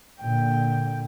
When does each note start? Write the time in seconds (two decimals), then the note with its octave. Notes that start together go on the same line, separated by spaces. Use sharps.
0.21 A#2 D3 G5